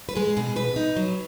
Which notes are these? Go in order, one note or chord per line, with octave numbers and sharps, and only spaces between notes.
B4
G#3 G#4
B2 G#4
B2 B4
D#4
F#3